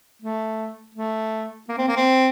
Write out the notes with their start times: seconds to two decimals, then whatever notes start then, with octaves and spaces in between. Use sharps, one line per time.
0.22 A3
0.95 A3
1.69 A#3
1.78 C4
1.88 A#3
1.96 C4